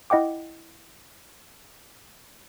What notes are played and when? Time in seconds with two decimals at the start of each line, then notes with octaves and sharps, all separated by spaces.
0.10 E4 D#5 F#5 G5 D6